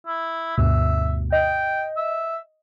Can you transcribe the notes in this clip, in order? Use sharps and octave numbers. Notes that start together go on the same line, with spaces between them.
E4
D2 G2 B2 E5
D#5 G5
E5